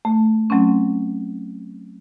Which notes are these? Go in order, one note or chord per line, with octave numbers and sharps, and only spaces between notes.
A3
F#3 A3 C4 C#4